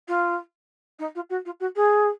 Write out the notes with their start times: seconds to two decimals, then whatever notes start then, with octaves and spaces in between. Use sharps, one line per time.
0.08 F4
0.99 D#4
1.15 F4
1.29 F#4
1.45 F4
1.60 F#4
1.75 G#4